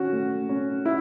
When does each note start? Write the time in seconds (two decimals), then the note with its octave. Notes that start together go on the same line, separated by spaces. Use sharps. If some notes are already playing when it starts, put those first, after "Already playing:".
Already playing: D#3 C#4 F#4
0.13 A3
0.49 C#4
0.86 E4